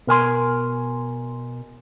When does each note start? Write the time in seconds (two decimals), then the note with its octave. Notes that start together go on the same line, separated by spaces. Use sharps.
0.07 B2 A#4 G#5 C6